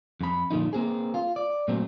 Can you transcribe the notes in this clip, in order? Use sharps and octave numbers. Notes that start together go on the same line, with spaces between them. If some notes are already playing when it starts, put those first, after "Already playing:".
F2 B5
A#2 D3 F3 D#4
A#3 C4 G#4
F4
D5
A#2 F#3 A3 C4